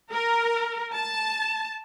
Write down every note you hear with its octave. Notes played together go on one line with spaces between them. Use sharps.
A#4
A5